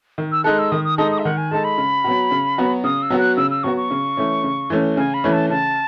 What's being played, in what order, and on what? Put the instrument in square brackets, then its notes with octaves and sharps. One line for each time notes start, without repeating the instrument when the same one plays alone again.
[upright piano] D#3
[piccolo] E6
[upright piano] G#3 D#4 A4 [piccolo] F#6
[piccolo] E6
[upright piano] D#3 [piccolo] D#6
[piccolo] D#6
[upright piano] G#3 D#4 A4 [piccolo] D#6
[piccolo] D#6
E5
[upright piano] D#3 [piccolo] F#5
[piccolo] G#5
[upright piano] G#3 D#4 A4 [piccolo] A5
[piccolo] B5
[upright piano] C#3
F#3 B3 F#4
C#3
F#3 B3 F#4
[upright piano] C#3 [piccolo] D#6
[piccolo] E6
[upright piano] F#3 B3 F#4
[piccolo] F#6
[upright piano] C#3 [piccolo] E6
[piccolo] E6
[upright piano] F#3 B3 F#4 [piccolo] C#6
[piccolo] C#6
[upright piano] C#3
E3 A3 C#4
C#3
E3 A3 C#4
[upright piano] C#3 [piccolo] G#5
[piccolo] B5
[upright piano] E3 A3 C#4
[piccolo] A5
[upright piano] C#3 [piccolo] A5